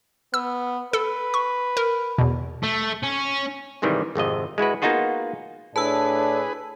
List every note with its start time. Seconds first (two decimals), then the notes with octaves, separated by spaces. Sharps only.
0.34 B3 E6
0.93 A4 B4
1.34 C#6
1.77 A#4
2.18 E2 B2
2.64 A3
3.03 C#4
3.82 G#2 C3 D#3 E3 G3
4.15 G#1 F2 C3 D#5
4.58 G#3 E4 F#4 B4
4.82 A#3 B3 D#4 F4 F#4 G#4
5.76 A2 D4 G#4 B4 A5 E6